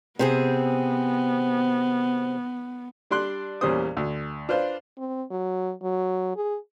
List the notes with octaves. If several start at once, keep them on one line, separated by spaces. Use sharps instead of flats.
C3 B3 C4 G#4
G3 D4 D5 C6 F#6
E2 A#2 G3 C#4 C5 D#6
D2
D4 F4 B4 C5
C4
F#3
F#3
G#4